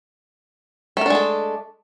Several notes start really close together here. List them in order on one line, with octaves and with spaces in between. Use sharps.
A3 A#4 D4 G#3 A4